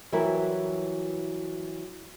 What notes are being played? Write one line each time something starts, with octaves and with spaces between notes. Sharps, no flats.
E3 F#3 G3 E4 A#4 B4